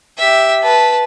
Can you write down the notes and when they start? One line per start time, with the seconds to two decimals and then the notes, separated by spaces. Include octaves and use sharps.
0.18 G4 E5
0.63 B4 A5